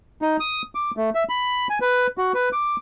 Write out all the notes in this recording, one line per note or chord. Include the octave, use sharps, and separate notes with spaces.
D#4
D#6
D6
A3
E5
B5
G#5
B4
F#4
B4
D6